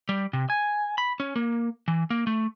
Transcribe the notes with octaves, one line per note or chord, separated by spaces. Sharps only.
G3
C3
G#5
B5
C#4
A#3
E3
A#3
A3